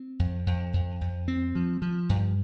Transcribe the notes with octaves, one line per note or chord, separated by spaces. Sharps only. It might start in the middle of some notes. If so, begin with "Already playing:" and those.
Already playing: C4
F2
F2
F2
F2
C4
F3
F3
G2